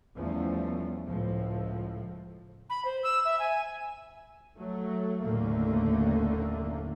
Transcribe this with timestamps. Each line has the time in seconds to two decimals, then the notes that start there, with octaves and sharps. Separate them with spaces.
0.15 E2 F3 G3 A3 C#4
1.08 C#2 A2 F3
2.70 B5
2.85 C5
3.03 E6
3.25 E5
3.39 G#5
4.56 F#3 A3
5.23 F#1 D#2 A2 D3 A3 A#3